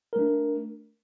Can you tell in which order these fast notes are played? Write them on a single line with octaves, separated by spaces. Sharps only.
A#4 A3 D4